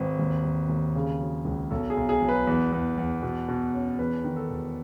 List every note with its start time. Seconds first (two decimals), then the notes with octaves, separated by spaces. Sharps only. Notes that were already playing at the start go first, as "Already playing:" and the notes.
Already playing: G#1 B4
0.19 D#2
0.45 D#2
0.69 D#2
0.95 C#3
1.20 F#3
1.45 C#2
1.71 B1 A4
1.90 G#4
1.97 B1
2.09 G#4
2.22 F#3
2.29 B4
2.47 E2
2.72 E2
2.98 E2
3.22 B2
3.48 B2
3.74 C#4
3.99 E2 B4
4.24 D#3
4.36 A4
4.49 E1